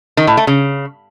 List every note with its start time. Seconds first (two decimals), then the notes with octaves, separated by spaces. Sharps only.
0.17 D#3
0.27 A2
0.37 A3
0.47 C#3